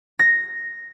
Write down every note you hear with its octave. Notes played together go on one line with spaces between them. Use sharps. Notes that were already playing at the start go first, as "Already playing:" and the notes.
A#6